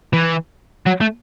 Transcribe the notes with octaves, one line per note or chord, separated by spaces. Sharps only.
E3
F#3
A3